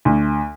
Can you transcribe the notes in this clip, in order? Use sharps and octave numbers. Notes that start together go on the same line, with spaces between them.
D2